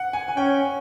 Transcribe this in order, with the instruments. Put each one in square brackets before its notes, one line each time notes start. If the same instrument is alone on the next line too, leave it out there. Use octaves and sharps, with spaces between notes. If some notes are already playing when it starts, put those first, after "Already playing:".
Already playing: [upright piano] F#5
G#5
G#5
[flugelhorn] C#4 [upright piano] G5